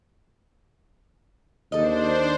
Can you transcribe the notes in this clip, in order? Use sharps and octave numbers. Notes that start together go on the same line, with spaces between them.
D#2 D4 A4 C5 D#5